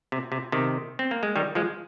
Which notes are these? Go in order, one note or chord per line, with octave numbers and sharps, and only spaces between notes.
C3
C3
C3 D#3
C4
A#3
G#3
D#3 G3
F3 G#3